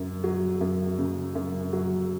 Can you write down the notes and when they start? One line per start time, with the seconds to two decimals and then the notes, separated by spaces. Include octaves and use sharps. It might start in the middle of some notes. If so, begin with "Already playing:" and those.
Already playing: F#2 C#3
0.24 F#3
0.61 F#2
0.99 C#3
1.35 F#2
1.73 F#3